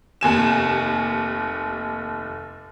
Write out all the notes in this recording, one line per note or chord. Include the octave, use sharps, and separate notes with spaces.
F1 D#2 G#5 E7